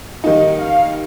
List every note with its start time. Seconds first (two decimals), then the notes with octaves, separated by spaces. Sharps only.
0.24 D#3 G3 A#3 D#4 D#5
0.59 F5